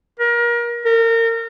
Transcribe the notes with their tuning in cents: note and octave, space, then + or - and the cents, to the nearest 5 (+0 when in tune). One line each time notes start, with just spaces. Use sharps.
A#4 +30
A#4 -30